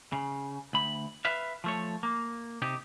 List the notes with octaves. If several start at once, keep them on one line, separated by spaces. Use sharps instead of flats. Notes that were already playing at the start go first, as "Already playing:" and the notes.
C#3
D2 B5
B4 E5 F5
F3 A3 C#5
A#3
C3 D#4 G4